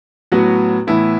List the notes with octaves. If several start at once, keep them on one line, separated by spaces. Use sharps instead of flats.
A2 F#3 B3 F#4
A2 E3 B3 E4